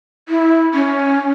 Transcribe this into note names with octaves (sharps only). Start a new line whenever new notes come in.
E4
C#4